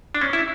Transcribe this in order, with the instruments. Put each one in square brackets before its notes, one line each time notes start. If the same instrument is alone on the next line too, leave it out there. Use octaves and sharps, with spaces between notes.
[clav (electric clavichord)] D4
C#4
E4